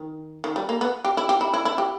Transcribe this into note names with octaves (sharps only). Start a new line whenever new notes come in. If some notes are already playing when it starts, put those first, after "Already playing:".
Already playing: D#3
D#3
G3
A#3
B3
G4
E4
G4
E4
E4
E4
G4